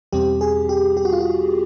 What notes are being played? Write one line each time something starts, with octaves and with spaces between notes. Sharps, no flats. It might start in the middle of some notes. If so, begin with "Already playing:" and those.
E2 B2 G3 C4 G4
G#4
G4
G4
F#4
F4
F#4